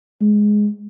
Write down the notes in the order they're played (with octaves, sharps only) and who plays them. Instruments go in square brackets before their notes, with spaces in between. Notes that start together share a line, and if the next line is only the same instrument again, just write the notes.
[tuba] G#3